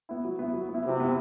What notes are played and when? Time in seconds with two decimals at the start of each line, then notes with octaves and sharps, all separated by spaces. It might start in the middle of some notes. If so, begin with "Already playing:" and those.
0.09 B3 E4
0.25 F#3
0.39 B3 E4
0.54 F#3
0.69 B3
0.74 E4
0.85 C3 F#3
1.00 B3 E4